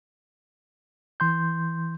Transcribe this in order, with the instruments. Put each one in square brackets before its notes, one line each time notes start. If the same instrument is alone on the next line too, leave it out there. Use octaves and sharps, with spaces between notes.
[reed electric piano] E3 C6 G6